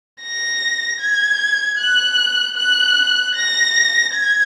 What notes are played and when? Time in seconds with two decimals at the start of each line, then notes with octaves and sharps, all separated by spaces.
0.22 A#6
1.01 G#6
1.79 F#6
2.57 F#6
3.35 A#6
4.14 G#6